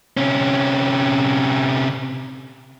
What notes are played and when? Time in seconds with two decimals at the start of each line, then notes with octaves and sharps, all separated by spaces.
0.17 C3 C#4